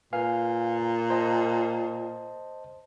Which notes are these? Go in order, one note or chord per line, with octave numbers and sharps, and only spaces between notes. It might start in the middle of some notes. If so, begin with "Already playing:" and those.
A#2 B4 F5 G#5
C5 D#5 A5